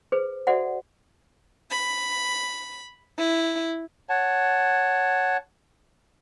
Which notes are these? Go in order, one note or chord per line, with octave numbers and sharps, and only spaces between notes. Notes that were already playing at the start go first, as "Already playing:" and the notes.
G#4 B4 C5
F#4 A4 C5 D5 E5 F#5
B5
E4
C#5 F#5 A5